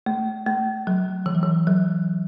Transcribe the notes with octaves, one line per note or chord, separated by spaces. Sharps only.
A3
A3
F#3
E3
F#3
E3
F#3